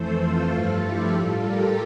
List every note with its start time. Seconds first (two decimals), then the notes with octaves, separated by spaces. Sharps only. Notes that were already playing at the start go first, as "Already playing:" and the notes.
Already playing: F2 E3 A3 A4 C5
0.21 F4 A4
0.53 G2 F3 A3
0.83 E4 G4
1.14 A2 G3 F4 A4
1.45 G4 A#4